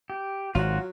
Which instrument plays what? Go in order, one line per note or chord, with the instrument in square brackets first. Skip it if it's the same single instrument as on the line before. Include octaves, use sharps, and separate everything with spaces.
[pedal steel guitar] G4
[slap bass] G#1 [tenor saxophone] F#3 [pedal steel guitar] F4 F#4